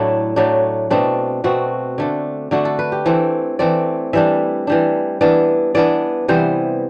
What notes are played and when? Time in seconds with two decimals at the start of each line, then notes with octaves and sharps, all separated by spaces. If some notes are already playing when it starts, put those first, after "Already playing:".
Already playing: A2 F#3 A3 D4 E4
0.36 A2 F#3 A3 D4
0.90 B2 A3 C4 D4
1.44 B2 A3 C4 F#4
1.98 D3 A3 D4
2.51 D3 A3 D4 F#4
2.65 A4
2.79 B4
2.92 G4
3.06 E3 A3 C4
3.59 E3 A3 C4 D5
4.13 E3 G3 D4 E5
4.67 E3 G3 D4
5.21 E3 B3 D4 D5
5.75 E3 B3 D4 D5
6.28 C3 E3 G3 B3 C5